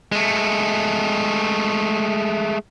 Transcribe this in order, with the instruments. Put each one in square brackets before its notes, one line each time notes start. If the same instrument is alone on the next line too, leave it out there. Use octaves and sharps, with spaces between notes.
[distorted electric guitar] G#3 A3